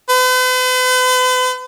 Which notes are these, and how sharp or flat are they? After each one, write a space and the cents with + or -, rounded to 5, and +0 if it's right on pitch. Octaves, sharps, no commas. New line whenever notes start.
B4 +45